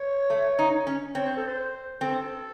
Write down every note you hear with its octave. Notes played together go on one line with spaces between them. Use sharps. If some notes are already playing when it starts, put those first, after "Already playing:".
Already playing: C#5
A3
D#4
C#4
C4 C#5
C5
A4
C5
C4 A4